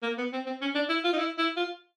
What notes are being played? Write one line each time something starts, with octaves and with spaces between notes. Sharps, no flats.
A#3
B3
C4
C4
C#4
D4
E4
F4
D#4
E4
E4
F4